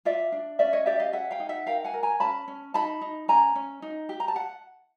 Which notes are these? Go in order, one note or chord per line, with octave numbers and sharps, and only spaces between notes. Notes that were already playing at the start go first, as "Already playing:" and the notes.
F4 D5 E5
D4
C#4 D5 E5
C#5 D#5
G4 D5 E5
D#5 F5
G#4 E5 F#5
F5 G5
D#4
E5 F#5
A#4 F5 G5
F#5 G#5
A#4
G#5 A#5
C#4 A5 B5
C#4
D#4 A5 B5
D#4
C#4 G#5 A#5
C#4
D#4
G4
A#5
A5
F#5